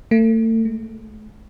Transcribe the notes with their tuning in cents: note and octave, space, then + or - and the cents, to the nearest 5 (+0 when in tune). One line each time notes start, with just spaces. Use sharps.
A3 +35
A3 -45